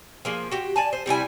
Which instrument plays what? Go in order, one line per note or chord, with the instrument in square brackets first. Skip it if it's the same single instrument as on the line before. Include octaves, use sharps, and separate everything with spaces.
[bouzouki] F3 A#3 G#4
F#4 G4
D5 G#5 A5
C5
C3 G3 E4 G#5